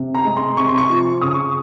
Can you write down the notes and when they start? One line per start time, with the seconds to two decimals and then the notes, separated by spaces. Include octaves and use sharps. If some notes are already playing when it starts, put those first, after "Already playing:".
Already playing: C3
0.15 A#5
0.25 G#3
0.37 C6
0.57 C3 C#6
0.68 C6
0.78 C#6
0.90 F3
1.21 C#3 D#6
1.34 C#6